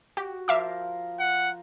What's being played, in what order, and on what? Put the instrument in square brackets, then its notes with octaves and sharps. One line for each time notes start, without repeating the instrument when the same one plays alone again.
[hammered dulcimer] F#4 [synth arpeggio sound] G4
[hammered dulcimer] F3 A#4 [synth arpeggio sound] E5 F5 D6
[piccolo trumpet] F#5